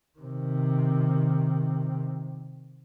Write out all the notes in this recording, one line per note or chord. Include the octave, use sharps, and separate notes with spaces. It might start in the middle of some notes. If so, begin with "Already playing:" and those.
C3 D#3